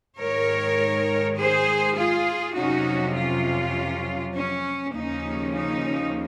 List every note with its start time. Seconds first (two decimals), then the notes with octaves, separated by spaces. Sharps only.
0.18 G#2 D#3 G#3 A#4 C#5
1.37 G#4 C5
1.97 F4 G#4
2.56 F2 C3 F#3 C#4 D#4 F#4
3.15 C#4 F4
4.34 C#4
4.94 D#2 C#3 F3 A#3 C#4 D#4
5.53 D#4